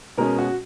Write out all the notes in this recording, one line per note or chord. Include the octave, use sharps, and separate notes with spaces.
B2 G#3 C#4 A#4
F#4